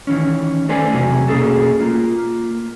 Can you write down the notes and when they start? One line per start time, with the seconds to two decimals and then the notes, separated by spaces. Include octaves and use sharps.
0.07 D#3 E3 C#4
0.68 A3 B3 A4 C5 D5 G#5
0.93 B1 E2 C3 F#3 G#5
1.28 B2 A#3 C#4 G#4 A4
1.80 A#3 F4